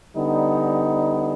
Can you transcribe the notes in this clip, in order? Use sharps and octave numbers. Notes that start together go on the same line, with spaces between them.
D3 G3 B3 D#4